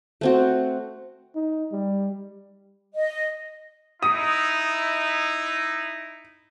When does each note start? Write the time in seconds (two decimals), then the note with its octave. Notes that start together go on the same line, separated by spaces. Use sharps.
0.21 A3 C4 F#4
1.35 D#4
1.72 G3
2.94 D#5
4.03 D#4 E4 D#6